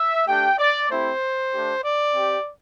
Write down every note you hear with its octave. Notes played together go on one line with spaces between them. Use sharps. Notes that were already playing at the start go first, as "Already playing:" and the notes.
Already playing: E5
A3 D4 G4 G5
D5
A3 C4 E4 G4 C5
A3 D4 G4
D5
C4 G4